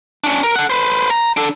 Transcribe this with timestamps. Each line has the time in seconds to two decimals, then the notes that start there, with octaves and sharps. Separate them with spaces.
0.24 C#4 D4
0.43 A#4
0.56 A4 F#5
0.70 B4 C5
1.10 A#5
1.37 D4 A4